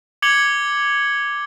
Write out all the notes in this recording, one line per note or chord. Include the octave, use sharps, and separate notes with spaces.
D6 G#6 C#7 F#7 G7